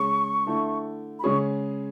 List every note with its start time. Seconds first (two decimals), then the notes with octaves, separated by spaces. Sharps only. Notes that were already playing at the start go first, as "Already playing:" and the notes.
Already playing: C#3 G#3 C#4 G#4 C#6
0.46 D3 A3 E4
1.19 B5
1.24 C#3 G#3 C#4 G#4 C#6